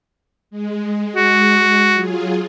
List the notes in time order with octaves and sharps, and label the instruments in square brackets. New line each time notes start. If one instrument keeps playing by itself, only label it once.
[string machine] G#3
[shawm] F#4
[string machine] F#3 F4 G#4